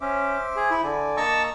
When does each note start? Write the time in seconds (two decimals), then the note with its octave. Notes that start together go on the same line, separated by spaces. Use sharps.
0.01 C#4 C5 E5 D6
0.56 G#4
0.71 E4
0.84 D3 D5 G#5
1.17 A#3 D#5 A5 A#5 C#6 E6